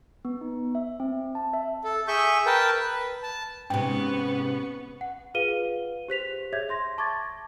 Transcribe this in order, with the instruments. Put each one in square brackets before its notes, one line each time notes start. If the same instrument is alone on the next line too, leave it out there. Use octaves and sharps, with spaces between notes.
[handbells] B3
D#4
E5
C4
A5
E5
[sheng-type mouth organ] A4
G#4 E5 C#6 G6
A#4 B4 G5 A5
B4
A5
[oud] G#2 C3 [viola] B3 C#6 [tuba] C#4 [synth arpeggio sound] G5
[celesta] F#5
F4 G#4 B4 F5 D#7 G7
G4 C5 B6 F7
G#4 C#5 E5 G6 G#6
E5 C6 A#6
A5 C#6 D6 G#6 A6